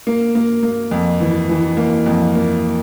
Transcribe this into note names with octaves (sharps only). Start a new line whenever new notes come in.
A#3
A#3
A#3
F2
E3
E3
A#3
F2
A#3